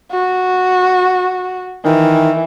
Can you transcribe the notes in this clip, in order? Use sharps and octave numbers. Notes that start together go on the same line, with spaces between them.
F#4
D#3 E3